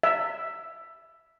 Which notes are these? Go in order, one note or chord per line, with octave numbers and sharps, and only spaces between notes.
E5